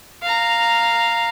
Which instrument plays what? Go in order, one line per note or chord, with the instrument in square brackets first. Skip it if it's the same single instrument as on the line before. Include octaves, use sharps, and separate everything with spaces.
[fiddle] F5 A#5